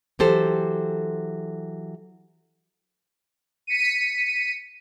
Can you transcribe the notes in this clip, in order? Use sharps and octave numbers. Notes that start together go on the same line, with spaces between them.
E3 F#3 G4 A4 C5
B6 C#7 D#7